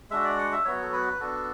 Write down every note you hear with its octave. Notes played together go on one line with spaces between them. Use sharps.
G#3 D4 F#4 E5
D5
F#5
E5
F#3 B3 F#4 C#5
A4
B4
B3 D4 F#4 A4